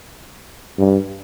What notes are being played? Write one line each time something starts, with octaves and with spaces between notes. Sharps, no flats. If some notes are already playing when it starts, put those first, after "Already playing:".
G2